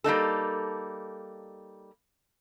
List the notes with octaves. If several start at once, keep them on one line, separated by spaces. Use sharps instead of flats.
G3 A#3 D#4 A4